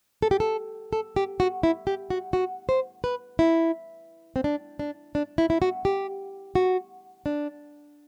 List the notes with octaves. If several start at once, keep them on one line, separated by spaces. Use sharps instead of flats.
A4
G4
A4
A4
G4
F#4
E4
G4
F#4
F#4
C5
B4
E4
C4
D4
D4
D4
E4
E4
F#4
G4
F#4
D4